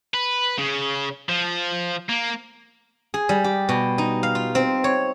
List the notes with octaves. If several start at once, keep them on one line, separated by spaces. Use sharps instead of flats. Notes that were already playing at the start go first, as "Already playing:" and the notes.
B4
C#3
F3
A#3
G#4
G3
G4
B2
D#4
F5
F4
C4
C#5